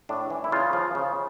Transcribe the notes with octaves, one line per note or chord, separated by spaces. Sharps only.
A2 D4
E3
E4
C#3 F4
F3
C#3